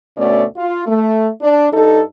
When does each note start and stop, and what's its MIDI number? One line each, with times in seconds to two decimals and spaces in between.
0.17 0.44 38
0.17 0.44 47
0.17 0.44 57
0.17 0.44 61
0.17 0.44 74
0.56 0.83 65
0.87 1.28 57
1.41 1.67 62
1.72 2.01 43
1.72 2.01 63
1.72 2.01 69